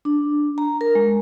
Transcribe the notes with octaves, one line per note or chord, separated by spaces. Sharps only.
D4
A#5
A#4
G#3